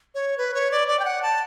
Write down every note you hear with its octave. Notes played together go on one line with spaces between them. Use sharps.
C#5
B4
C#5
D5
D5
G5
F#5
A5